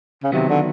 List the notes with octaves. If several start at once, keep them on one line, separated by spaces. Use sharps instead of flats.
C#3
C3 D#3 F#3 B3
D3